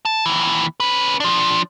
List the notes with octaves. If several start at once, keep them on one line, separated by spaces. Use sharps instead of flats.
A5
D#2 E3
C#4 B4
F3 D4